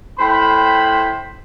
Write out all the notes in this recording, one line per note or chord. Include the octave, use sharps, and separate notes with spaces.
A2 C5 G5 B5